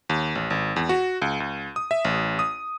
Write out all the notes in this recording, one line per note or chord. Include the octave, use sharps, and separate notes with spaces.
D#2
A1
G#1
E2
F#4
C#2
C#2
D#6
E5
A1
D#6